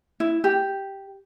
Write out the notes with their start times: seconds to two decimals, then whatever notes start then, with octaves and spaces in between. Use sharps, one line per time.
0.20 E4
0.44 G4